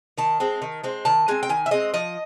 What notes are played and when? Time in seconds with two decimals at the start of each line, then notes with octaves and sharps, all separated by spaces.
0.18 D#3 A5
0.40 G#3 C4
0.62 D#3
0.83 G#3 C4
1.05 D#3 A5
1.28 G#3 C4 G#5
1.43 G5
1.49 D#3 G#5
1.66 E5
1.71 G#3 C4 D#5
1.94 F3 D#5